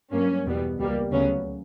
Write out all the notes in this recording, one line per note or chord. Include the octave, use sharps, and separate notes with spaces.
G2 F#3 A#3 C#4
E2 B2 G3 B3
C#2 B2 G3 A#3
D2 C#3 F#3 B3 C#4